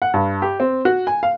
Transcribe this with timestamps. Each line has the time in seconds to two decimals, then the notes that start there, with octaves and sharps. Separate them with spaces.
0.02 F#5
0.14 G2
0.42 G4
0.60 C4
0.85 F#4
1.07 G#5
1.23 F5